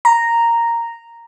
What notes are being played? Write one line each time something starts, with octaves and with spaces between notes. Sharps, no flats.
A#5